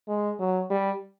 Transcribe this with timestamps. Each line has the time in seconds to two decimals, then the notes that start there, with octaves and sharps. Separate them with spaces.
0.08 G#3
0.40 F#3
0.70 G3